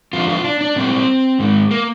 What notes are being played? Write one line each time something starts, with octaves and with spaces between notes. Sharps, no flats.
F2 D3 G3 F4
F4
D4
D4
A#2 G3 C4
G#2 D#3 G#3
A#3